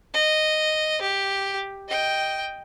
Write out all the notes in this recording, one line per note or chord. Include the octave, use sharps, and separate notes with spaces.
D#5
G4
D#5 G5